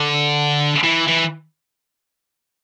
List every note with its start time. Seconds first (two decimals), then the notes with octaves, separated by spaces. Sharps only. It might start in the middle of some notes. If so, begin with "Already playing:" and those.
Already playing: D3
0.84 E3
1.08 E3